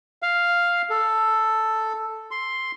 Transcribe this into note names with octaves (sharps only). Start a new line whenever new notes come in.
F5
A4
C6